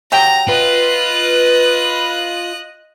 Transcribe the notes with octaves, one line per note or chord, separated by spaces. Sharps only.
F#3 G4 G5 A#5
F4 B4 D#5 F#6